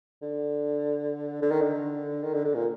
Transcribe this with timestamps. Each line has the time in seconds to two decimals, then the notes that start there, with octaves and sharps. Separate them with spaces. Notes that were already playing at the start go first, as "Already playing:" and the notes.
0.22 D3
1.43 D3
1.51 D#3
1.61 D3
2.24 D#3
2.34 D3
2.45 D3
2.54 A#2